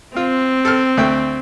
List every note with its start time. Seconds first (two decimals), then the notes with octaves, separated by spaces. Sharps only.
0.16 C4 F4
0.65 A4 F6
0.97 D2 A3 G5